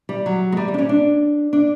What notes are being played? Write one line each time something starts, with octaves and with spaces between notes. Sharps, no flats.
G3
F#3
G#3
G3
G3
D4
C#4
D4
D4